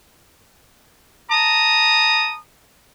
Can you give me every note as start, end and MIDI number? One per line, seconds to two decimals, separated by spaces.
1.30 2.37 81
1.30 2.37 82
1.30 2.37 87